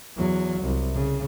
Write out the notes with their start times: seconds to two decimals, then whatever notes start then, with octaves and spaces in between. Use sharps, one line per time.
0.16 E2 F#3
0.61 C2
0.94 C#3